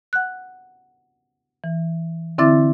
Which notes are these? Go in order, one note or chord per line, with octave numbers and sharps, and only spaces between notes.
F#5 F#6
E3
D3 C4 E4 E5 D6 A6